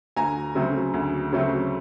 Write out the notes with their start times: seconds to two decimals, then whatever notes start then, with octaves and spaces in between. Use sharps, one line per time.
0.16 D2 G#5 A#5
0.55 C#3 F#3 A3 C4
0.94 D2
1.32 C#3 F#3 A3 C4